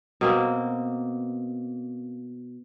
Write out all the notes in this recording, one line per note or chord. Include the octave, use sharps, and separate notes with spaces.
B2 A#3 C4